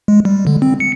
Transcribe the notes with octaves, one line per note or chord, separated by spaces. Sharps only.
G#3
G3
D3
C4
C#7